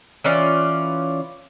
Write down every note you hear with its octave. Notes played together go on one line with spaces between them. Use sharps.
E3 C#4 F4 D5